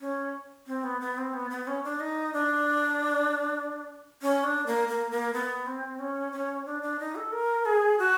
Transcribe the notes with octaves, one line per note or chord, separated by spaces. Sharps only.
C#4
C4
B3
B3
C4
B3
B3
C#4
D4
D#4
D4
C#4
D4
A#3
A#3
A#3
B3
C4
C#4
C#4
D4
D4
D#4
A4
A#4
G#4
F#4